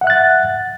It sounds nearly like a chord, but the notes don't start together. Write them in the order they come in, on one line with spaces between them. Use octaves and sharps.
F#5 E5 F#6 A6